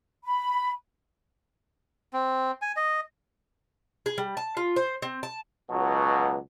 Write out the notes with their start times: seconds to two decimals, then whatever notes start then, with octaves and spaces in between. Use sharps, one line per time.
0.24 B5
2.13 C4
2.62 G#5
2.77 D#5
4.06 G#4
4.18 G3
4.37 A5
4.57 F4
4.76 C5
5.02 C4
5.23 A5
5.70 C#2 B2 F#3